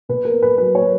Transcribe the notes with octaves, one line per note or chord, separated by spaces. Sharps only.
B2 B4
A#4
B3
B4
F#3 B4
C#5
F#3